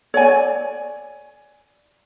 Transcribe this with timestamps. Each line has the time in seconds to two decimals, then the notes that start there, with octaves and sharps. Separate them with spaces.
0.14 C#5 D5 G#5